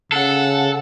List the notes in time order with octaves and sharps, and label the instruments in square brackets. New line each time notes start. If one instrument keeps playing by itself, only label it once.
[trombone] C#3 [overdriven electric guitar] A4 [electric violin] F#5